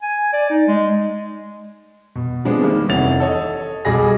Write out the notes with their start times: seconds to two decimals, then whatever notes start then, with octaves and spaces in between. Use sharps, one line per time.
0.02 G#5
0.33 D5
0.50 D#4
0.68 G#3
2.16 B2
2.45 F3 G#3 B3 C4 D4
2.62 D#3 G3 A#3
2.89 F1 E3 C#4 F#5 A6 F7
3.20 A4 C#5 D#5
3.85 B1 G3 F#4 G#4 A#6